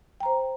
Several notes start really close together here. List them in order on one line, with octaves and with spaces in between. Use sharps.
G5 A#5 C5